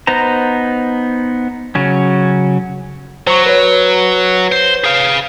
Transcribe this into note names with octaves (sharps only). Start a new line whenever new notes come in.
B3 D#4 C5 A#5
C#3 F#3 C#4
F#3 C5 C#6
B4 C#5
C5
G#4 F5